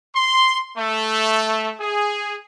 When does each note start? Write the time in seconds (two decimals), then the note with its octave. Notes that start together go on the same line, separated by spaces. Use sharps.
0.15 C6
0.77 A3
1.80 G#4